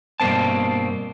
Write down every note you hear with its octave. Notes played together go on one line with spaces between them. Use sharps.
G2 B2 A#3 C4 A5